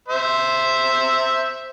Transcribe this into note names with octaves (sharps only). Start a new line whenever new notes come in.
C5 E5